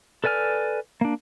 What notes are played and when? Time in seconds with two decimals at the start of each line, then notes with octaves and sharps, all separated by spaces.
0.24 A4 B4 D5 G#5 F6
1.01 A#3 D4